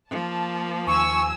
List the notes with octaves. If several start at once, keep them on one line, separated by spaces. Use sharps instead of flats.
F3 A#3 A5
D#2 G#5 C#6 E6